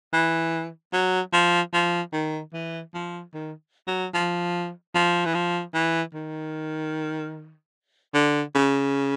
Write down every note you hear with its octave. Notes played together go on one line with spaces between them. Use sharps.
E3
F#3
F3
F3
D#3
E3
F3
D#3
F#3
F3
F3
E3
F3
E3
D#3
D3
C#3